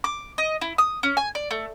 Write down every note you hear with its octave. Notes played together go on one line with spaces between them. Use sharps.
D6
D#5
E4
D#6
C#4
G#5
D5
A3